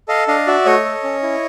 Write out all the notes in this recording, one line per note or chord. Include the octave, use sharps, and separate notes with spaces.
A4 D#5 F5
D4 D#5 F5
F#4 D5 E5
A3 C#5 D#5
A4
C#4
E4